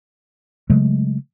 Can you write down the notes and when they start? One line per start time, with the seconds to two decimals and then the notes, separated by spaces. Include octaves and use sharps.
0.70 C#3 F#3 G#3 A3